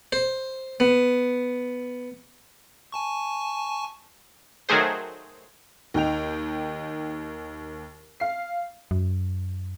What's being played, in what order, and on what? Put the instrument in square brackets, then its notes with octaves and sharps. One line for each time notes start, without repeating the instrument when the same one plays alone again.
[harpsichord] C5
B3
[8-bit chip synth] G#5 A5 C#6
[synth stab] D#3 F#3 A3 G#4 C5
[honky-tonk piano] D#2 D#4 G5 F7
F5 C7
[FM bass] F#2